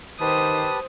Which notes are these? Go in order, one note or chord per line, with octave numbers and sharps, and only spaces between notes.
D#3 G4 B4 C5 A5 D#6